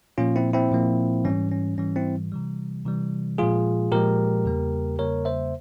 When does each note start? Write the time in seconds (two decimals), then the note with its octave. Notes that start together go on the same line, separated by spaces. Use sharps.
0.18 A#2 F3 A#3 C#4 F4
0.36 C4 E4
0.53 C4 E4
0.71 A#2 F3 A#3
1.25 G#2 E3 G3 C#4
1.51 C#4
1.78 G#2 E3 G3 C#4
1.96 C4 E4
2.32 C3 E3 G3
2.85 C3 E3 G3
3.38 A#2 F3 G#3 F4 G#4
3.92 A#2 F3 G#3 G4 A#4
4.45 E2 C#3 G3 A#3
4.99 E2 C#3 G3 A#3 A#4 C#5
5.25 C5 E5